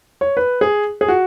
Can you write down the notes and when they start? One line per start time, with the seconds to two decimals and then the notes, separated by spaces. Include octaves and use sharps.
0.21 C#5
0.37 B4
0.61 G#4
1.01 G#4
1.08 F#4